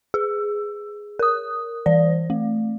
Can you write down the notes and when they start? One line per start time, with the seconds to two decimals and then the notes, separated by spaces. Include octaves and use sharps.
0.14 G#4
1.19 A#4 D#6
1.86 E3 D5
2.30 A3